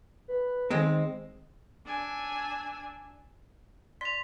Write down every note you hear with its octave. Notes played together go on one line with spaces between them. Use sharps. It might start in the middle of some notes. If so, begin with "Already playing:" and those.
B4
D#3 G#3 C4
D4 G#5 E6
D5 C6 B6 F7